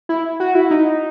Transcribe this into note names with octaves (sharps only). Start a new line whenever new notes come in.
E4
F#4
E4
D#4